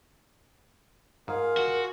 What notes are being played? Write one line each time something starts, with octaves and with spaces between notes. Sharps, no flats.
G#2 F4 G#4 A#4 F5
F#4